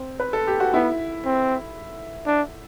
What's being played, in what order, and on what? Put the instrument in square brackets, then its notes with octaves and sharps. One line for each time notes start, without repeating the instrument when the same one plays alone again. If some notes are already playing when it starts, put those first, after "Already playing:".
Already playing: [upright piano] C4
B4
A4
G4
F#4
[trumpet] B3 [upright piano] E4
[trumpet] C4
D4